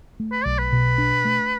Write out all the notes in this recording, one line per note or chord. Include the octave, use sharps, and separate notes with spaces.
A3
B4
B1 D5
B4
B2
D4
A3